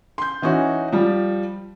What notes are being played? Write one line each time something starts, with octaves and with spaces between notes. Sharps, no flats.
C6 G6
E3 C#4 D#4 F#4
F3 G3